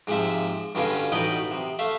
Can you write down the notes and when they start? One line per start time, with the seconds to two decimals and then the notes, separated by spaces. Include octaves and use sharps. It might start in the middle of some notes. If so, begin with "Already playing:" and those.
0.07 G#2 C3 F3 E5
0.75 G2 B2 D3 C#4 F4
1.12 A1 B2 B3 D#4 B4 G5
1.51 C3
1.79 A3 E5 F5